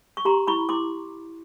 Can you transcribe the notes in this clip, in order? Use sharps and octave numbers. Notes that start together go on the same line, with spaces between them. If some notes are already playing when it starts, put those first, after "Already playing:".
C#6
G4 A#5 C6
E4 B5 C#6
E4 C6 D6